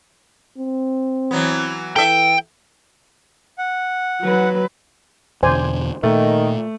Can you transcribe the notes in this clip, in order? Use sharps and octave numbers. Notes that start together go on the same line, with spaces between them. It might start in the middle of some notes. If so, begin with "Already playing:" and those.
C4
E3 F#3 B3
E3 A4 E5 G5
F#5
F#3 B4
E2 B2 D3 C5 D5 G#5
A#2 D#3 A3